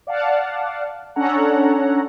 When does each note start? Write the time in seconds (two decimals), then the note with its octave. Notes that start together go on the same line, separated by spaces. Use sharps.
0.07 D5 F5 F#5 A5
1.16 C#4 D4 A4 C#5 F#5 A#5